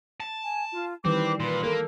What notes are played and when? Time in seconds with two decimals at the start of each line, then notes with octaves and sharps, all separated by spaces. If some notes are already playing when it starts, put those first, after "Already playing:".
0.20 A5
0.44 G#5
0.71 F4
1.05 D#3 E3 G3 C4 B4 D6
1.40 A#2 B4 C6
1.64 A#3 A4 A#4